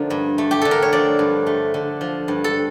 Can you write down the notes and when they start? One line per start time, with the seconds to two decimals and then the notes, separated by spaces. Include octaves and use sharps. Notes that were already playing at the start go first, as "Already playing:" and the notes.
Already playing: D3 F3 A3 A#4
0.10 G2
0.38 A3
0.51 G4
0.62 D3 A4
0.71 A#4
0.82 C#5
0.93 F3 D5
1.19 G2
1.47 A3
1.74 D3
2.01 F3
2.28 G2
2.44 A4